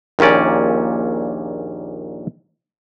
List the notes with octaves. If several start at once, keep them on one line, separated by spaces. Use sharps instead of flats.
A#1 D#2 A#2 C#4 D5